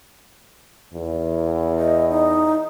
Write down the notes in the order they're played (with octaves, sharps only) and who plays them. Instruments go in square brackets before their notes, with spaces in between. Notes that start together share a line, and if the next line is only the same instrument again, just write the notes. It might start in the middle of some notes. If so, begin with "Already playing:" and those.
[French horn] E2
[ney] D#5
D#4